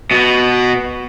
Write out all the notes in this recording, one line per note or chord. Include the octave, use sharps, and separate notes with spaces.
B2 B3